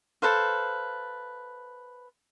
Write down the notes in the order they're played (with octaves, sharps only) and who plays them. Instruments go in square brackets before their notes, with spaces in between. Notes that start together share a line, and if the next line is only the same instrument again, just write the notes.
[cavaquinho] A4 B4 C5 F5